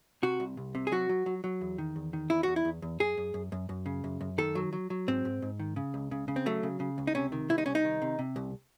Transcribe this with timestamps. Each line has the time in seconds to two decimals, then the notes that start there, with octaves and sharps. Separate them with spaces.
0.23 C3 F#4
0.40 C2
0.57 C2
0.75 C3
0.87 G#4
0.92 F#3 F#4
1.09 F#3
1.26 F#3
1.44 F#3
1.61 E2
1.78 D#3
1.96 E2
2.13 D#3
2.30 E2 E4
2.43 E2 F#4
2.56 E4
2.65 E2
2.82 E2
3.00 F#2 G#4
3.18 F#2
3.34 F#2
3.52 F#2
3.69 F#2
3.86 C#3
4.04 F#2
4.21 F#2
4.38 D#3 A4
4.55 F#3
4.73 F#3
4.90 F#3
5.08 G#2 C4
5.25 G#2
5.42 G#2
5.60 D#3
5.76 C#3
5.94 C#2
6.11 C#3
6.28 C#3
6.36 C4
6.46 F#3 A3
6.63 C#3
6.80 C#3
6.98 C#2
7.07 D#4
7.15 C3 C#4
7.32 D#3
7.49 C2 E4
7.58 D#4
7.66 C2 C#4
7.75 D#4
7.85 D#3
8.02 C3
8.19 C3
8.36 C2